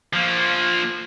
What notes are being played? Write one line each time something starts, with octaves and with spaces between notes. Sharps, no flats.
F3 A#3